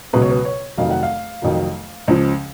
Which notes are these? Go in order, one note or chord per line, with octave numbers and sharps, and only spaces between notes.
C#2 B2 F#3 B4
C#5
B4
C#5
F1 F2 D#3 F#3 F5
F#5
F5
F1 F2 D#3 F#3
C#2 C#3 F3